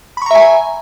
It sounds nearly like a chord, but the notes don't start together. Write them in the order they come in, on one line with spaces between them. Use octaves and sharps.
B5 C#6 A#5 E5 G#5